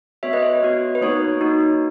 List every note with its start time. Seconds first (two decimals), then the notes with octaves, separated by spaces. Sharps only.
0.23 B3 F#4 C#5 E5
0.33 B4 D#5
0.42 C#5
0.52 B4
0.62 B3 F#4
0.95 B4
1.01 A#3 D#4 F#4 C#5
1.41 A#3 D#4 F#4